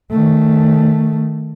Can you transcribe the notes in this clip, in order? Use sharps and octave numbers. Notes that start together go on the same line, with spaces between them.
D#3 A3